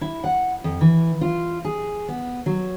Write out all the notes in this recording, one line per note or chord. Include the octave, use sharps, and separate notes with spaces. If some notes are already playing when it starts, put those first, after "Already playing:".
E4
F#5
F2
E3
F4
G#4
B3
F#3